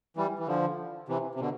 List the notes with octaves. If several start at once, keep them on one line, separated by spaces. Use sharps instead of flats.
E3 G3
E3
D3 F3
C3 E3
C3
B2 D3